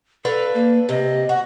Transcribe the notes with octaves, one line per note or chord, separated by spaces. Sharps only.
D4 A4 B4 F5
A#3
C3 D#5
F#4